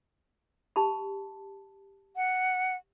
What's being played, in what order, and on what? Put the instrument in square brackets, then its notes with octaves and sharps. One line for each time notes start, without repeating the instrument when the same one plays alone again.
[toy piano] G4 A5 B5
[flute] F#5